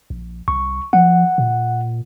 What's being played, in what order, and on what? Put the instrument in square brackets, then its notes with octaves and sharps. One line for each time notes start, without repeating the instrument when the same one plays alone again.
[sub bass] A#1
[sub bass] C2 [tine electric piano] C#6
[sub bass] F3 [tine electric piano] F#5
[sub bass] A#2